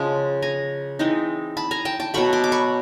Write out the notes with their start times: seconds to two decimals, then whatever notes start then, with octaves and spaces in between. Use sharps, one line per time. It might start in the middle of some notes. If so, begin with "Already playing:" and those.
Already playing: C#3 F3 G#3
0.42 G#5 A#5
0.99 E3 G#3 C4 D#4
1.57 A5 B5
1.71 G#5 A#5
1.85 G5 A5
2.00 G5 A5
2.14 B2 F#3 A3 B5 C#6
2.33 C6 D6
2.44 D6
2.52 B5 C#6